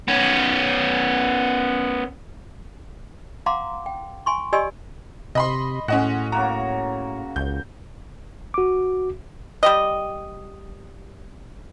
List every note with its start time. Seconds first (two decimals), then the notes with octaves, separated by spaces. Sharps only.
0.08 B3 C#4
3.46 F5 F#5 A#5 C6 D6
3.86 G5
4.26 G#5 C6 C#6
4.53 G4 D5 D#5 G#5 C6 E6
5.35 C3 D#5 B5 C6
5.88 A2 G#3 C#4 F#4 D#5 F#5
6.32 C#3 A#3 F#4 A#5
7.36 C#2 G6
8.54 F#4 D6
9.63 G3 G4 D#5